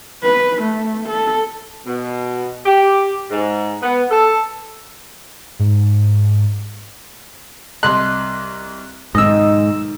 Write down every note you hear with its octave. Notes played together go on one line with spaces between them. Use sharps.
B4
A3
A4
B2
G4
G#2
B3
A4
G#2
C2 D#5 C6 F#6
B1 G#2 D#3 D#5 E6